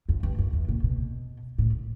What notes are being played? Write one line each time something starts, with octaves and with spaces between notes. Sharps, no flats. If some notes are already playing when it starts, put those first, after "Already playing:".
F2
G2
F#2
E2
A#2
B2
A2